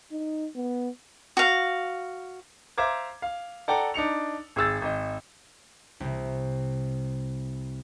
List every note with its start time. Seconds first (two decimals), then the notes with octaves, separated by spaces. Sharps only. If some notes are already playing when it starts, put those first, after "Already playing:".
0.12 D#4
0.56 B3
1.37 F#4 F5
2.78 C5 E5 F5 A#5 D6 G#6
3.22 F5
3.68 A4 D5 F#5 G5 A#5
3.94 D4 D#4 C#7 F7
4.56 G#1 G#4 E6 A6
4.82 G#1 D#5
6.00 C2 C3